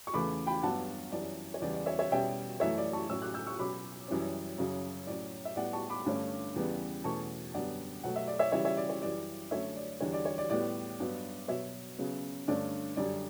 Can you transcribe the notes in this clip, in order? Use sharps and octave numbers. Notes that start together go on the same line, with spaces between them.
C#6
E2 C#3 E3 A3 B5 D6
G5 B5
G2 F#3 B3 F#5 A5
F#2 E3 G3 C#4 D5
C#5
E2 C#3 E3 G3 D5
D5
C#5 E5
C#5 E5
B2 G3 C#4 E5 G5
F#2 E3 A3 C#5 E5
D5
A5 C#6
A2 F#3 C#4 C#6 E6
D6 F#6
E6 G6
C#6 E6
B2 F#3 C#4 B5 D6
F#2 E3 G3 C#4
F#2 C#3 F#3
A2 F#3 C#4 D5
E5
A2 G3 B3 D5 F#5
A5 C#6
B5 D6
G2 D3 A3 C#4
E2 C#3 G3 B3
E2 B2 A3 C#4 A5 C#6
F#2 D3 G3 B3 D5 F#5
B2 F#3 A3 F#5
E5
D5
C#5 E5
C#3 E3 G3 C#5 E5
C#5 E5
D5
C#5
F#2 E3 G3 D5
F#2 D3 A3 C#4 C#5 E5
D5
E2 D3 G3 C#5
D5
C#5
D5
A2 G3 B3 D5
G2 F#3 B3
B2 F#3 B3 C#5 E5
C#3 F#3 B3
G2 D3 A3 C#4 D5
F#2 D3 G3 D5